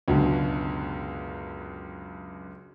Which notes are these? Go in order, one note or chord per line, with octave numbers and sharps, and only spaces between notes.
C#2 F#2 B2 D3